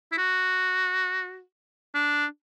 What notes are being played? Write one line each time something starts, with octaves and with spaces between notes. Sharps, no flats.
E4
F#4
D4